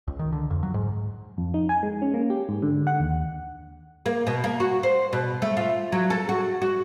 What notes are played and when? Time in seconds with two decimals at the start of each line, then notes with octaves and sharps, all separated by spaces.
0.08 C#2
0.19 D#3
0.32 D3
0.50 F2
0.63 F#3
0.74 G#2
1.38 F2
1.54 D#4
1.69 G#5
1.83 G#3
2.02 C#4
2.14 A#3
2.30 G4
2.49 G#2
2.62 D3
2.87 F#5
3.00 D#2
4.06 A#3
4.27 B2
4.44 A#3
4.60 F#4
4.83 C5
5.13 B2
5.42 A3
5.57 F4
5.92 F#3
6.10 A4
6.29 F#4
6.62 F#4